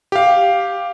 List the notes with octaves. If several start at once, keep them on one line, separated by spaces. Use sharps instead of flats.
G4 F5